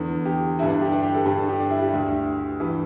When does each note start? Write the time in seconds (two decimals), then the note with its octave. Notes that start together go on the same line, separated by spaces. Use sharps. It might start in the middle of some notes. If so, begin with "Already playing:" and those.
Already playing: E2 D3
0.26 G4
0.59 D3 E4
0.63 G2
0.70 D4
0.82 G4
0.92 D4
1.03 G4
1.14 A4
1.26 G2 D3 G4
1.37 A4
1.49 G4
1.60 D4
1.70 E4
1.82 G4
1.94 D2 D3
2.60 G2 E3 G4